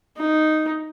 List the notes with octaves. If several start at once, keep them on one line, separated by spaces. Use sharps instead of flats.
D#4